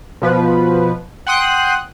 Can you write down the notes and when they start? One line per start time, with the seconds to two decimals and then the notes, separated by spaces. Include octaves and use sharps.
0.22 B2 F3 B4
1.27 F#5 G5 C6 D#6 F#6